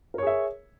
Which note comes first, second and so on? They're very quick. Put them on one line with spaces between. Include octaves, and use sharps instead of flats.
A#4 C#5 G#4 E5